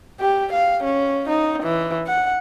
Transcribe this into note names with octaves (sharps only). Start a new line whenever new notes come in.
G4
F5
C#4
D#4
E3
F#5